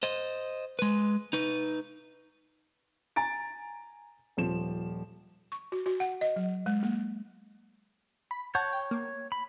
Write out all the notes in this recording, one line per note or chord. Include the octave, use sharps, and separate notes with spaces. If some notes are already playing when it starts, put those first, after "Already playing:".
C5 D#5
G#3 B4
D#4 B4
G#5 A#5 A6 D7
D#1 F3 E7
C#6
F#4
F#4
F#5
D#5
F#3
G#3
A#3
B5
C#5 F#5 A5 C#6 G6
G5
A#3
B5